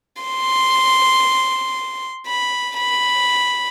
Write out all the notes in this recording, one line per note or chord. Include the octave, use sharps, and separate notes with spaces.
C6
B5
B5